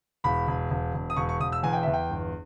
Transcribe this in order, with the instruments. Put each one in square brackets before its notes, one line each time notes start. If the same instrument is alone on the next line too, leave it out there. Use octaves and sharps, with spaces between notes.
[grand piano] E1 B5
E1
E1
E1
D#6
E1 C#6
C#6
E1 D#6
E6
E2 G#5
G5
E2 E5
G5
G1